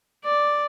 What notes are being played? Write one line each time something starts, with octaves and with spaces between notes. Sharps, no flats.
D5